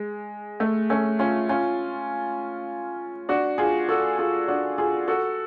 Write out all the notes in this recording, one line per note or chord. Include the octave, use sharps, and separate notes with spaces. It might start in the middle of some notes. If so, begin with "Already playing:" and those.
Already playing: G#3
A3
A3 C#4
C#4 F4
C#4 F4
D4 F#4
F4 G#4
F#4 A4
F4 G#4
D4 F#4
F4 G#4
F#4 A4